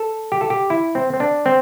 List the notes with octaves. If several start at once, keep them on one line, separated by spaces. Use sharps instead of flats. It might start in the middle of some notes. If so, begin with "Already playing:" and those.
Already playing: A4
G4
A4
G4
E4
C4
C4
D4
C4